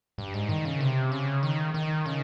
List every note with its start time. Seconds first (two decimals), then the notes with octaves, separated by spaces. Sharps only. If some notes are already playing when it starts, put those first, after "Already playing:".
0.18 G2
0.34 G#2
0.49 D#3
0.65 C#3
0.81 C3
1.12 C#3
1.43 D#3
1.74 D#3
2.06 C#3